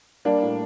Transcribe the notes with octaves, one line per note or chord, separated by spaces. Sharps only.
G3 A#3 D4
A2